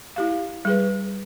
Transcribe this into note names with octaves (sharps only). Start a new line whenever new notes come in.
E4 G4 F5
G3 G#4 B4